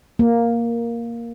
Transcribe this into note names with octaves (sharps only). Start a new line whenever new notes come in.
A#3